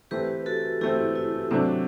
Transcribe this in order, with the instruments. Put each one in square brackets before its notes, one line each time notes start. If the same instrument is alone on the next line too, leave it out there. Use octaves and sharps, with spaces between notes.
[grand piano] E3 A3 C4 [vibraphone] G4 B4
[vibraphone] F#4 A4
[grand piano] E3 A3 C4 [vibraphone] E4 G4
[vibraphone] E4
[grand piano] C3 F#3 A3 D4 [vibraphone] C4